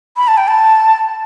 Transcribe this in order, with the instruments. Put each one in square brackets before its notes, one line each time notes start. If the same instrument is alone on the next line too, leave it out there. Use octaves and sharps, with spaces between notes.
[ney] B5
A5
G5
A5